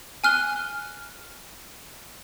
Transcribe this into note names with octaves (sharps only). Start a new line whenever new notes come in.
G#5 F6 F#6 G7